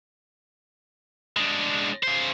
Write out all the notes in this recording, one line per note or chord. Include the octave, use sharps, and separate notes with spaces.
G#3 D4
C#3 C5